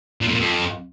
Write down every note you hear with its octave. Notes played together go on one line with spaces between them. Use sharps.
A#2
F2
A#2
F2